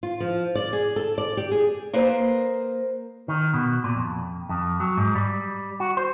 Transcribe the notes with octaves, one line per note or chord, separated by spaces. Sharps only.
F4
F3
D5
G#4
A4
D5
G4
G#4
A#3 B4 C5 D#5
D#3
B2
A#2
F2
F2
F#3
G#2
G3
F#4
C5